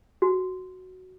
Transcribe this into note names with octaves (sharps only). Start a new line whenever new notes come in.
F#4